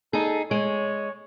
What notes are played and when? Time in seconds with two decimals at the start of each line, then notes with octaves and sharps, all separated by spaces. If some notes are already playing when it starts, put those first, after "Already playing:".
0.13 D#4 G#4 A4
0.51 G#3 C#5